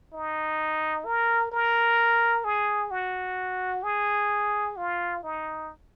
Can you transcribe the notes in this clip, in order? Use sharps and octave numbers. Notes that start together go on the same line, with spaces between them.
D#4
A#4
A#4
G#4
F#4
G#4
F4
D#4